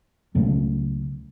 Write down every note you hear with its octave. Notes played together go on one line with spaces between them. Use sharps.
C#2 C#3 F#3 A3